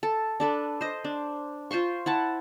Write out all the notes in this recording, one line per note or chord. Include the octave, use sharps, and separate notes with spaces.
A4
D4 A4 B4
C5 D#5
D4
F4 C5 C6 C#6
E4 F#5 A5